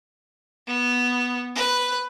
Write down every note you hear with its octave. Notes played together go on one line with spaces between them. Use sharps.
B3
B4